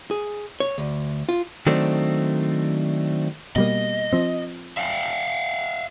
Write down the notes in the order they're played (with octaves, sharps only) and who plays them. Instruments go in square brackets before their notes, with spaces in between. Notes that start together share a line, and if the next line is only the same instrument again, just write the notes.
[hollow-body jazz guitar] G#4
C#5
D2
F4
[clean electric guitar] D#3 F#3 A3 C4 D4
[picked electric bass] B2 G3 A#3 [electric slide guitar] D#5
[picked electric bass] F3 C4
[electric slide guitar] E5 F5 G5